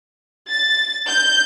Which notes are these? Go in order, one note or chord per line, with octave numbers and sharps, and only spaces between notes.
A6
G6